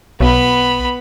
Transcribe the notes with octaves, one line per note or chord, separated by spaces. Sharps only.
B1 B3 B5